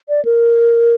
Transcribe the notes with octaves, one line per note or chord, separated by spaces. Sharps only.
D5
A#4